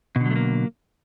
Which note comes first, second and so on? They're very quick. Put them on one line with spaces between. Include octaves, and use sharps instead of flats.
B2 D3 F#3 A3 A#3